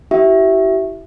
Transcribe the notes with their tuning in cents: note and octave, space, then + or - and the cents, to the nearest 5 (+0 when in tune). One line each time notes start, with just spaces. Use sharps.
E4 +5 G4 -40 E5 +0